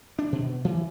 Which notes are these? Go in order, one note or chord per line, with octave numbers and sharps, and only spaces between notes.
D4
B2
E3